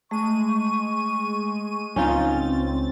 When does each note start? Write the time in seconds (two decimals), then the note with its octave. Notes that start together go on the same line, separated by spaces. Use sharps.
0.11 G#3 A3 C#6 D#7
1.96 C#2 C4 C#4 D#4 F4 A6